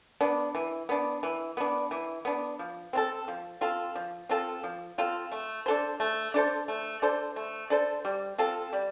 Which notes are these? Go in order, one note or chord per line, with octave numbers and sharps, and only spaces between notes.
B3 D4
E3
B3 D4
E3
B3 D4
E3
B3 D4
F3
C4 F4 A4
F3
C4 F4 A4
F3
C4 F4 A4
F3
C4 F4 A4
A3
D4 A4 C5
A3
D4 A4 C5
A3
D4 A4 C5
A3
D4 A4 C5
G3
C4 F4 A4
G3